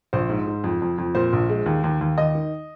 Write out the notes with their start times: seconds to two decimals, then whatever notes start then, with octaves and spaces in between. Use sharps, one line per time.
0.13 A#1 C5
0.29 G#2
0.48 G#2
0.64 F2
0.82 F2
0.98 F2
1.15 A#2 C5
1.33 A#1
1.49 G#3
1.66 D#2
1.84 D#2
2.01 D#2
2.18 D#2 D#5
2.35 D#3